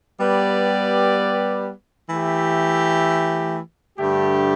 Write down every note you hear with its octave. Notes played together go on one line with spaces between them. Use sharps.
G3 B3 G4 B4 D5
E3 A3 G4
G2 D3 A3 G4